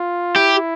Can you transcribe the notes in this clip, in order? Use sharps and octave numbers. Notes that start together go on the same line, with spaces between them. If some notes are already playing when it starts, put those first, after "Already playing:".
Already playing: F4
E4 G4